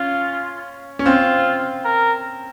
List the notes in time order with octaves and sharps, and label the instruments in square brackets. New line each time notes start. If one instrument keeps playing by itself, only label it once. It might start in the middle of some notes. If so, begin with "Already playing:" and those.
Already playing: [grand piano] C#4 [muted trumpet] F4
[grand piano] C#4
[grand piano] C4 [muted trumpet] F4
[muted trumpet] A#4